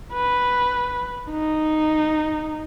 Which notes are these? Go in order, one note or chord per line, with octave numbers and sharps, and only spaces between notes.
B4
D#4